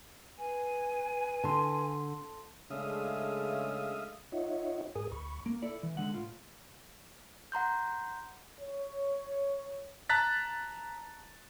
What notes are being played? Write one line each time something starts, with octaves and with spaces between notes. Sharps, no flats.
B4 G#5
D3 A5 C6
C#3 G#3 A3 D4 E5 F5 D#6
D#4 F4 C#5 D#5 E5 F#5
G#2 G#4 A#4 G#5 D#6
D2 B5 C#6
A#3
E4 A4 D5
E3
D3 G#3 F#5
A2 F4
F#5 A#5 C6 G6
C#5
A5 A#5 F#6 A6 B6